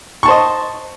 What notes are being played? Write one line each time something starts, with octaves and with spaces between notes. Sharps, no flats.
C5 D#5 A5 C#6